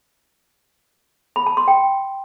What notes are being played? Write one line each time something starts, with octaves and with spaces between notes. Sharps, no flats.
B5
A5
C6
G5